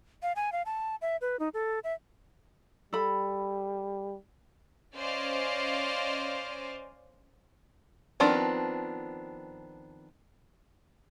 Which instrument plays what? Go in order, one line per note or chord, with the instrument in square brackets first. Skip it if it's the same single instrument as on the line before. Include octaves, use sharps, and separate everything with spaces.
[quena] F5
G#5
F5
A5
E5
B4
D#4
A4
E5
[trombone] G3 [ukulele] A4 B5
[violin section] C#4 C5 D5 D#5 F5 G#5
[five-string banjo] D#3 F3 B3 C4 D4